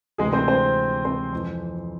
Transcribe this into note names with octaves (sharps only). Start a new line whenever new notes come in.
D2 C3 E3 G#3 G#4
C4 C5
C4 C5
C4 C5
F2 E3